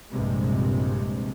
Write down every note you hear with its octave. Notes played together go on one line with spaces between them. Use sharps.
A#1 G2 C3 G#3